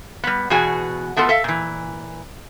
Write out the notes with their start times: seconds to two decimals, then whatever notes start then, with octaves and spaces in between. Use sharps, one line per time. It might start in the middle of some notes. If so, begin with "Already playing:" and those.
0.24 G3 B3
0.50 E2 B2 F#4 G#4 G#5
1.17 A3 B3 F4 A4
1.29 A4 E5 F5
1.44 A#2 E3